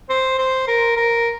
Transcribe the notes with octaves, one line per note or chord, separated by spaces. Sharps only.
C5
C5
A#4
A#4